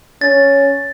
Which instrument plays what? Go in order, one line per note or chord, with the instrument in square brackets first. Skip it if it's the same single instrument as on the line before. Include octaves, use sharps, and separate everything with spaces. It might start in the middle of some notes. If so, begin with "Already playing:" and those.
[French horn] C#4 [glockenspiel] A6